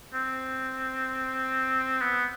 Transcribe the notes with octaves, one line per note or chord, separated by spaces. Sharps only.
C4
B3